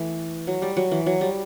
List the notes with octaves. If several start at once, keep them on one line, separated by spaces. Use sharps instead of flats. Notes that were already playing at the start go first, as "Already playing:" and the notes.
Already playing: E3 A3
F#3
G3
F#3
E3
F#3
G3